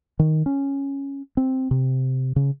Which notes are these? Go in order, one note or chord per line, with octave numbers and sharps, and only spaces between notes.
D#3
C#4
C4
C3
C#3